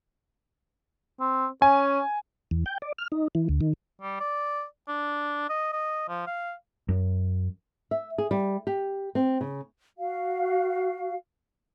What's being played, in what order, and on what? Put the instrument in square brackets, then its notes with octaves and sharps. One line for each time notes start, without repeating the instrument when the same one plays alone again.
[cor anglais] C4
[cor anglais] C#4 [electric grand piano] G#5
[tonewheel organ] E2
G5
D5
F6
D#4
E3
D2
D#3
[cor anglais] G3
D5
D4
D#5
D#5
F3
F5
[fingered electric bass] F#2
[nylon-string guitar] E5
G#4
G3
G4
C4
C#3
[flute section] F#4 F5